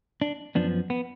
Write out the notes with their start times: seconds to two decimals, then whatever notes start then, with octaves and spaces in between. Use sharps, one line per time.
0.22 D4
0.55 F#2 F3 B3 D4
0.90 B3